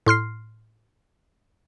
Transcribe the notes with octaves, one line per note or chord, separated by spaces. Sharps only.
A2 C6 F6 C7